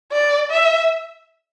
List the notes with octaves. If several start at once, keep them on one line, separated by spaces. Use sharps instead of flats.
D5
E5